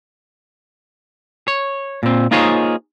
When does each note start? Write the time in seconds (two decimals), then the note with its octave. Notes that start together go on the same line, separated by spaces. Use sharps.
1.48 C#5
2.03 A#2 C4
2.31 A#3 D#4 F4 G#4 C5 C#5